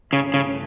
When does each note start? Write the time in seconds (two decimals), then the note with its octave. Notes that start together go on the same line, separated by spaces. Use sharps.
0.13 G2 C#3 E3 A3
0.34 C#3